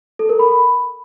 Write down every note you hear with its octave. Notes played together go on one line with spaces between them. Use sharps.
A4
A#4
B5